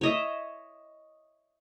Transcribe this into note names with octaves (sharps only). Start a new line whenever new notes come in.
C#5 D#5 E5